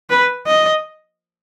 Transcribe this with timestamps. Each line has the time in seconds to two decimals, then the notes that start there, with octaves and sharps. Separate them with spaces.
0.10 B4
0.47 D#5